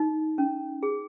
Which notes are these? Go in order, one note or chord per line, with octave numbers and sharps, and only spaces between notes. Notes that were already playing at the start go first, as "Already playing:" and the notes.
Already playing: D#4
C#4
G#4